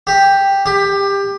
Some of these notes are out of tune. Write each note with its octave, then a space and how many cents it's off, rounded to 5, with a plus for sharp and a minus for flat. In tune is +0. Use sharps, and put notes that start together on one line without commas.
G4 +5
G4 +20